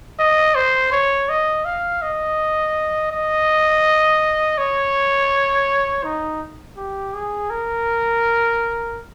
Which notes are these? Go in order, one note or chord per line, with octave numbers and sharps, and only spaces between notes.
D#5
C5
C#5
D#5
F5
D#5
D#5
C#5
D#4
G4
G#4
A#4